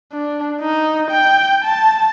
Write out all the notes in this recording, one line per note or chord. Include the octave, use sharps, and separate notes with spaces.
D4
D#4
G5
A5